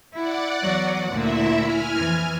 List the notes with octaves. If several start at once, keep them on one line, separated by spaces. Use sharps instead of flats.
E4 D5 F#5
E2 F#3
D2 A#2 E4 E5
G#5 F6
F2 E3